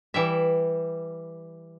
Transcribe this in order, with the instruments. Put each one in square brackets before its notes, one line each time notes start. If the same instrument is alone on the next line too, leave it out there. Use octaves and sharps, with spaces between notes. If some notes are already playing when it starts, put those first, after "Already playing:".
[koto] E3 G3 E5